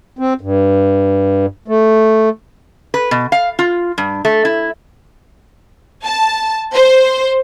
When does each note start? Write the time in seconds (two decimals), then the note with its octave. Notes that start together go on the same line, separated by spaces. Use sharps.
0.19 C4
0.41 G2
1.68 A3
2.94 B4
3.11 B2
3.32 F5
3.59 F4
3.98 G2
4.25 A3
4.45 E4
6.05 A5
6.75 C5